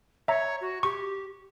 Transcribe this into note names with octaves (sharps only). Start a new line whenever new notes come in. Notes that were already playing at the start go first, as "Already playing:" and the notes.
C#5 E5 A#5
F#4
G4 C#6